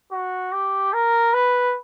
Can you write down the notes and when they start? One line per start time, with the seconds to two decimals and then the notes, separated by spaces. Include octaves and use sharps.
0.12 F#4
0.53 G4
0.93 A#4
1.34 B4